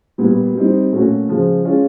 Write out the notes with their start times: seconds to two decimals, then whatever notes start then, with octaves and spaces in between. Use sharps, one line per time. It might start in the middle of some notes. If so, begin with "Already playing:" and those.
0.18 A#2 G3 B3
0.55 G3 C4 D#4
0.92 A#2 F#3 A3 C#4 F#4
1.28 C#3 F3 G#3
1.65 G#3 C#4 F4